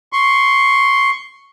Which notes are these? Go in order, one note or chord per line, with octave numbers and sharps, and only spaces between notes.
C6 C#6